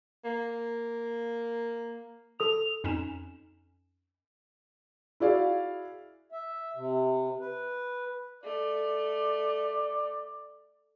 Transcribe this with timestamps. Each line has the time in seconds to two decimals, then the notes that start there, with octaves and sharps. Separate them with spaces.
0.24 A#3
2.40 A4 D#6 F7
2.84 F2 C#4 D#4 E7
5.20 E4 F#4 G#4 D5 F5
6.32 E5
6.76 C3
7.40 B4
8.44 A3 D5